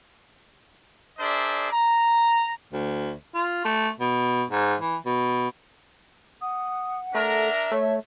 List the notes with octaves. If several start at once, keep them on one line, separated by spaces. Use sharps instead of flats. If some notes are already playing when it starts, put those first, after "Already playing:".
D4 G#4 A#4 C5 D5 E5
A#5
D2
F4
A3
B2
G#2
E3
B2
F#5 D#6
A3 D4 A#4 E5 A#5
A3 C#5